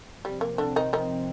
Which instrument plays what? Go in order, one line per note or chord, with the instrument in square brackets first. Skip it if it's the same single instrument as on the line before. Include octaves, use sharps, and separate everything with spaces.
[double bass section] C3 F3 C4 [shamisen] G3
[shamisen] A#3
D3 D4
D#3 D#4
D#3 D#4